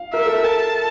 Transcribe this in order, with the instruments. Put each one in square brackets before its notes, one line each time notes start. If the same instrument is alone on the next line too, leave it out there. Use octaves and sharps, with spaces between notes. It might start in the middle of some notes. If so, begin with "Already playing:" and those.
Already playing: [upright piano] F5
[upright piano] A#4 [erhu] E5
[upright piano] A4
A#4
[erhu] A5